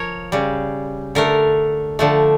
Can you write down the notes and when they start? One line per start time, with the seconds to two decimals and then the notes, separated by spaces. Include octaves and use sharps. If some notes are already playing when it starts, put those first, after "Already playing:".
Already playing: F3 A#4 C#5
0.32 C#3 G3
1.15 D3 A3 A#4
1.99 D3 F3 A3